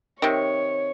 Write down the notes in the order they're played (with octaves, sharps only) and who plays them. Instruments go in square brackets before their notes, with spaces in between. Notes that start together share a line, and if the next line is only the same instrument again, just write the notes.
[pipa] C3 D#3 [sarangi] C#5